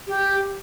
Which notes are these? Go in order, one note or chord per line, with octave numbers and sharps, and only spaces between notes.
G4